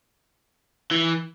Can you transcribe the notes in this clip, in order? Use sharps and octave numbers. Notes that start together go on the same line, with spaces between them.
E3